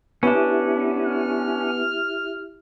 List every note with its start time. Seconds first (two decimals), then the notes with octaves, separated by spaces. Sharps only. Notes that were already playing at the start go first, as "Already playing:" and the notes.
0.23 B3 C#4 D4 E4 G4 E5
1.05 F6